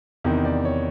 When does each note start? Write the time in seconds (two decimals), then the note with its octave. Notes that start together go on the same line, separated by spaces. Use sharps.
0.24 E2 C3 D#3
0.45 D5
0.65 C#5